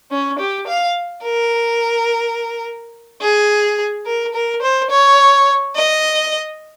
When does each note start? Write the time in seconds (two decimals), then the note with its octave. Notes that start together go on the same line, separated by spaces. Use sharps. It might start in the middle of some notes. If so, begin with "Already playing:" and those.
0.11 C#4
0.39 G4
0.67 F5
1.24 A#4
3.21 G#4
4.06 A#4
4.34 A#4
4.62 C5
4.90 C#5
5.76 D#5